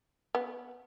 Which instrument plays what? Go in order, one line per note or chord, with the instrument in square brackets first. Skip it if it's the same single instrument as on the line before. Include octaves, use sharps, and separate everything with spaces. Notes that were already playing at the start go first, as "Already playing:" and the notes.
[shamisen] B3